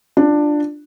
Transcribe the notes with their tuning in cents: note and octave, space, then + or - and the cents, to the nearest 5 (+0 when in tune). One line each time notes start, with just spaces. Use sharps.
D4 +10 F4 -5